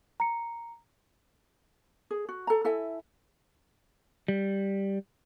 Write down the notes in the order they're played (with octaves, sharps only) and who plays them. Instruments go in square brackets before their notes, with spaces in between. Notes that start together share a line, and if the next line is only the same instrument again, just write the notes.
[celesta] A#5 C#7
[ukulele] G#4
F#4
A4 A#5
E4 A4 E5 G#5
[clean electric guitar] G3